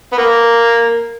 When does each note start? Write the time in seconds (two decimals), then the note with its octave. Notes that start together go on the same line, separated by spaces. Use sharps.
0.12 B3
0.18 A#3